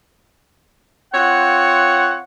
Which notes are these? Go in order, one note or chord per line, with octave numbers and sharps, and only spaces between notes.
C4 F4 C#5 F#5